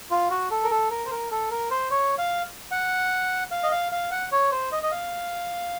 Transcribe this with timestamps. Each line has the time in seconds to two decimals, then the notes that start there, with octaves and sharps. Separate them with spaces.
0.11 F4
0.31 F#4
0.51 A4
0.64 A#4
0.71 A4
0.91 A#4
1.06 C5
1.11 A#4
1.31 A4
1.51 A#4
1.71 C5
1.91 C#5
2.18 F5
2.71 F#5
3.51 F5
3.63 D#5
3.71 F5
3.92 F5
4.11 F#5
4.32 C#5
4.52 C5
4.72 D#5
4.83 D#5
4.92 F5